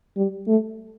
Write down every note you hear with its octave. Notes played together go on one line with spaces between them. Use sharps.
G3
A3